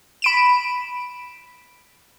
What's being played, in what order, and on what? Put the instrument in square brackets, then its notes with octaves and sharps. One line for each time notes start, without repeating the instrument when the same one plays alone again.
[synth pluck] B5 D7 E7